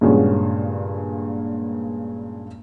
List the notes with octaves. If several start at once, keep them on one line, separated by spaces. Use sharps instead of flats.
G2 A#2 C#3 G#3 C#4 F#4